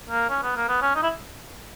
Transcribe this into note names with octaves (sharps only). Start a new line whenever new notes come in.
A#3
C#4
B3
A#3
B3
C#4
D#4
E4